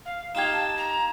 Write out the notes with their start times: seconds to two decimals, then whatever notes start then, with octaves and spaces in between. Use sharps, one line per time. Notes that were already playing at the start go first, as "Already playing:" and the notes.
0.05 F5
0.35 D#4 F4 G4 F5 G#6 E7
0.53 A5
0.77 A#5